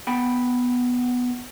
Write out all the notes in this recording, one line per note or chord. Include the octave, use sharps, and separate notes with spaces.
B3 G5 B5